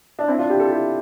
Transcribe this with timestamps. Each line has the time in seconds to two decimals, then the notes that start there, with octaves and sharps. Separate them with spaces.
0.19 D4
0.28 C4 E4
0.38 D4 F4
0.50 E4 G4
0.60 F4 A4
0.71 E4 G4